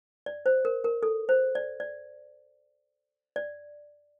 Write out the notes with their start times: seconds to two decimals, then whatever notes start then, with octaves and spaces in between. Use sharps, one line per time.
0.26 D5
0.46 C5
0.65 A#4
0.84 A#4
1.03 A4
1.29 C5
1.55 D5
1.80 D5
3.36 D5